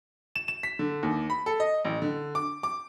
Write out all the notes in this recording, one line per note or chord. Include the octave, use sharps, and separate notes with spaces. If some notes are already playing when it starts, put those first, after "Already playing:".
E7
E7
B6
D3
D#2
B5
A4
D#5
A1
D3
D6
D6